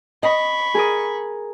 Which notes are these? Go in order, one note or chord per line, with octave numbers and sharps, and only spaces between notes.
D#5 B5 C#6
G#4 A#4 D#6